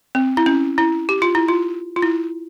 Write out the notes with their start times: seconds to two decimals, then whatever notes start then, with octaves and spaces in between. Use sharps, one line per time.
0.15 C4
0.37 E4
0.46 C#4
0.78 E4
1.09 G4
1.22 F4
1.35 E4
1.48 F4
1.96 F4
2.02 E4